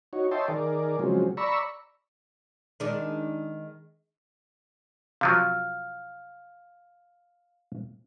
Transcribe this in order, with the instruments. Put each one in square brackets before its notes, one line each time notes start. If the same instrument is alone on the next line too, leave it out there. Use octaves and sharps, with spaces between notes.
[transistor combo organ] D#4 F#4 C#5
C#5 D#5 E5 G5 A5 C6
D#3 G#4 A#4 D5
C#3 F3 F#3 G#3 C4
D5 A#5 B5 C#6 E6
[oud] D#3 G#3 D4
[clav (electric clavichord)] C3 F3 F#3 [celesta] F5 F6